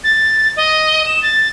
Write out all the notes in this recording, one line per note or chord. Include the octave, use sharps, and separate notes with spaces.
A6
D#5
E7
A6